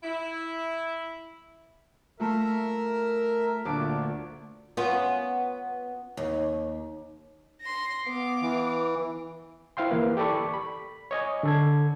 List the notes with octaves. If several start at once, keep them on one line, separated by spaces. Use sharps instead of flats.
E4
A3 F4 A#4 E5
D2 A#2 D4 D6
B3 C#4 F4
D#2
C6 A#6
B3 F5 D6
E3
E4 C5 F5 G5 C6
E3 A#3 B4
G4 A4 D5 B5 C#6
B5
C#5 D#5 G#5
D3 A4 G#6